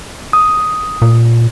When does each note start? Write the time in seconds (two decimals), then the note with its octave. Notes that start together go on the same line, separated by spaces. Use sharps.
0.33 D#6
1.02 A#2